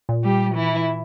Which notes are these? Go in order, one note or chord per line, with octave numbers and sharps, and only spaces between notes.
A#2
G3 G4
E3 E4